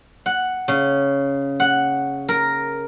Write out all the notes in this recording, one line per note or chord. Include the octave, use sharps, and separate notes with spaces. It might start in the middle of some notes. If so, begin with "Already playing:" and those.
F#5
C#3
F#5
A#4